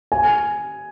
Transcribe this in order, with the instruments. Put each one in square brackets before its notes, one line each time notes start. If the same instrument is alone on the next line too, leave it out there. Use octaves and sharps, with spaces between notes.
[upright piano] G#5